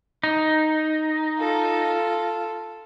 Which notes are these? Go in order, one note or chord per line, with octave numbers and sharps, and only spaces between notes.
D#4
F4 A4